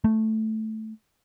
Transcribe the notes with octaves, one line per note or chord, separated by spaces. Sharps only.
A3